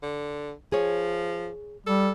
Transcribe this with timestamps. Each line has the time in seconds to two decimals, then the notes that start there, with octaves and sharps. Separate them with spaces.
0.02 D3
0.72 F3 G#4 C#5
1.87 G3 A4